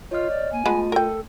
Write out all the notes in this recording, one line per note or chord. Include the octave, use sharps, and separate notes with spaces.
F4 C#5 D#5 F6
D5
A#3 G#5
G#3 A3 B3 F4 B4 A5
A4 A#4 G5